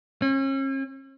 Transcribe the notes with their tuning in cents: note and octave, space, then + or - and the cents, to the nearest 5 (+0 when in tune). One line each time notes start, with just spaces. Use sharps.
C#4 -40